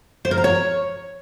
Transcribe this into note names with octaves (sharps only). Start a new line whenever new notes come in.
C5
A#4
A#5
C#5